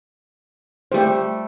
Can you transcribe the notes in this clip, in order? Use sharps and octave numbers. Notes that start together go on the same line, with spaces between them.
G3 A3 G4 C5